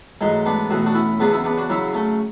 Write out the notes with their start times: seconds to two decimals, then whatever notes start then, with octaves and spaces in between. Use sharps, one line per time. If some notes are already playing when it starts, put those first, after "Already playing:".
0.21 A1 G#2 F#3 G#3
0.46 B3 D4
0.70 B1 A2 E3 F#4
0.86 D4 F#4
0.94 C#4 E4
1.20 E2 C#3 F#3 B3 D4
1.32 C#4 E4
1.44 B3 D4
1.57 D4 F#4
1.70 F#2 C#3 F#3 C#4 E4
1.94 A3 C#4